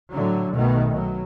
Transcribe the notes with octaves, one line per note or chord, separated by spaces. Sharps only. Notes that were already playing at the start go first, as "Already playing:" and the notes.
A2 D3 F#3
B1 B2 D#3 A3
B2 F#3